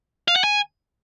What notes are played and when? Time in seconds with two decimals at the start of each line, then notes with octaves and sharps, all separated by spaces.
0.28 F5
0.36 F#5
0.44 G#5